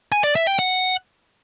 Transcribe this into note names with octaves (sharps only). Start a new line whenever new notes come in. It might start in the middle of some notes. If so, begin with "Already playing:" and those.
G#5
D5
E5
G5
F#5